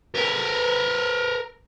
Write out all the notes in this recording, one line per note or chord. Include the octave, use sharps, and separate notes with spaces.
A#4 B4